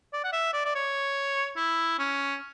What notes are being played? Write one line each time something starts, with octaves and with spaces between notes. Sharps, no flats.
D5
F#5
E5
D5
D5
C#5
E4
C#4